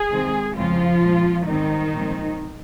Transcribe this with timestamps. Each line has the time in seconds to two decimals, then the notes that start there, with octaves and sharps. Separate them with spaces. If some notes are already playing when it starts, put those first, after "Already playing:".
Already playing: G#4
0.11 C3 D#3 G#3 C4
0.55 F2 C#3 F3 G#3 C4 F4
1.01 A#2 G#3 C4
1.47 G#2 D#3 G3 C4 D#4
1.93 A#2 F3 G#3 C4